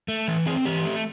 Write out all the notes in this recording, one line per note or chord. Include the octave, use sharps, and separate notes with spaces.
A3
E3
C4 G#4
E3 G4
A3